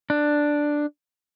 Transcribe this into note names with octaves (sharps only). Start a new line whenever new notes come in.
D4